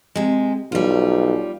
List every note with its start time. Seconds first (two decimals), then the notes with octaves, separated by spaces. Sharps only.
0.16 C3 G#3
0.72 B1 G3 F4